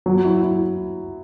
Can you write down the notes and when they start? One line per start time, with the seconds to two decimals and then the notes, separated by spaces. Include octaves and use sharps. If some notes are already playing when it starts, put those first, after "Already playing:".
0.06 F#3
0.25 E4
0.43 E4